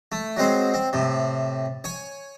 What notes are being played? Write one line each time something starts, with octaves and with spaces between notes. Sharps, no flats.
A3
F#3 G#3 C4 C5
C4
A2 C3
C#5 G#5